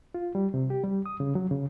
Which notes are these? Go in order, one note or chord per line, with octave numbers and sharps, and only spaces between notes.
F4
G3
C3
G4
G3
D#6
C#3
F#3
C#3